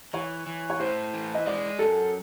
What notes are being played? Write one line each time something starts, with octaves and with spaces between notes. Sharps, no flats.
E3 C#5
E3
C#5
A2 C5
E3
D#5
G#3 D5
F#2 A4